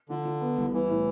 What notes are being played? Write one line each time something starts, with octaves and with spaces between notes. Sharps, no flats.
D3 F3
F3
B3
C2
E3 G3
A2